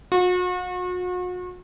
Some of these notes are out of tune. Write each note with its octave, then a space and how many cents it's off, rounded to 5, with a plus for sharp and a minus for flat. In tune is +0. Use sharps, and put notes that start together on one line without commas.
F#4 -40